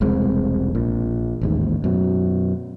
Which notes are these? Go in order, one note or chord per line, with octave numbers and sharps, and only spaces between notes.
E1 C2 G#3 C4
A#1 A#2
A1 D#2 G#2
F#2 B2